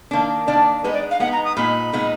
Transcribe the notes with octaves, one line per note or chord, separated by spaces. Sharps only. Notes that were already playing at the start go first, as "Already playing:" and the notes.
D#3 A#3 D4
D#3 A#3 D4 D5
G#3 B3 D#4 B4
D5
F5
G#3 B3 D#4 F#5
A#5
D#6
A#2 G#3 B3 D#4 B5
A#2 G#3 B3 D#4